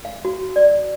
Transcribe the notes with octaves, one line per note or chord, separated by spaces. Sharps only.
F5
F#4
D5